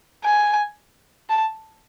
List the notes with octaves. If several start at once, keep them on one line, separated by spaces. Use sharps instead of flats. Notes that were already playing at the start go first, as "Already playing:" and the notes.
G#5
A5